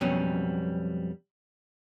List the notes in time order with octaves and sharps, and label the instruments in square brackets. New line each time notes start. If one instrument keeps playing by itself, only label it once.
[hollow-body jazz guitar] F2 B2 F#3 G3 C#4